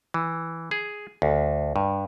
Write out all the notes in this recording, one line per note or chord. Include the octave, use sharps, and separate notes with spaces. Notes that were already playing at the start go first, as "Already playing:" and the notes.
E3
G#4
D2
G2